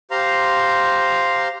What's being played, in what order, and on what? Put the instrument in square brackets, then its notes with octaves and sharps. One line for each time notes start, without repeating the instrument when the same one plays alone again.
[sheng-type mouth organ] G4 C5 F5 A#5 C6